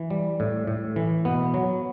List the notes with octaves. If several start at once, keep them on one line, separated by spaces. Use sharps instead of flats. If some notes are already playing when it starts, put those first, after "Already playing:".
Already playing: E3
G3
A2
A2
E3
B2 B3
F#3